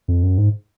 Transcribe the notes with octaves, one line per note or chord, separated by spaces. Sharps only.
F2
F#2
G#2